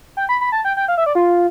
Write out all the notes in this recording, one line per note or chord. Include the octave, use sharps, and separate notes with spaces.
G5
B5
B5
A5
G5
G5
F5
E5
D5
F4